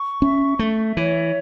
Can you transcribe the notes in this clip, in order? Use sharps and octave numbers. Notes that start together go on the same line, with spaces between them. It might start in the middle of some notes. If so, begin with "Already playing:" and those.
Already playing: C#6
C#4 E5
A3 E5
E3 C#5